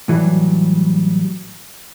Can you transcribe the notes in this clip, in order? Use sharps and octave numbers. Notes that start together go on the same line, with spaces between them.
A2 E3 F#3 G3